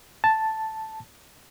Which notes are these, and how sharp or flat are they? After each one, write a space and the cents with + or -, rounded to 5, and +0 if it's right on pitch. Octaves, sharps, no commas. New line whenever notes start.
A5 +0